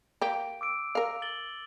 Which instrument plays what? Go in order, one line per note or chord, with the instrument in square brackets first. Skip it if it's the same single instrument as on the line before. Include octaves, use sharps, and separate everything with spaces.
[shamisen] A#3 G4 [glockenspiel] D7
[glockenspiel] D6 E6 D7
[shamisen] A#4 F5
[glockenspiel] A6 F#7 G7